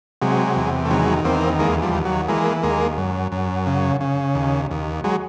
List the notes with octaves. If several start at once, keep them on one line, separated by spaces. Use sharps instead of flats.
C3 F#3 G#3
E2
A3
D#3 F#3 G#3
E2 A#3 C4
D#2 G#3 A#3
F3 G3
D#2
F#3
E3 G#3 A#3
D#2 G#3 A#3
F#2
F#2
C#3
C#3
D#2
D#2
F#3 G#3